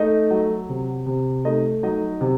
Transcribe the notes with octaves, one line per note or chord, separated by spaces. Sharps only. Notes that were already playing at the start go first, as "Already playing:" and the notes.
Already playing: A3 D#4 D#5
F#3
C3
C3
A3 D#4 D#5
F#3 D#4 D#5
C3